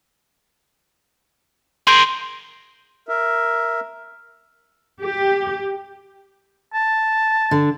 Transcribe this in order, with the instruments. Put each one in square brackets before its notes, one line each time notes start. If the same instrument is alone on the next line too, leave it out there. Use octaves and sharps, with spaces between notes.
[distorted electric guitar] G#4 A#4 [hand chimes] C6 G6 D7
[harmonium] A#4 E5
[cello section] G4
[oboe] A5
[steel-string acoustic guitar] D3